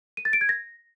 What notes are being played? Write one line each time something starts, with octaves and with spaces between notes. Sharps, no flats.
D#7
A6
D7
G#6
A#6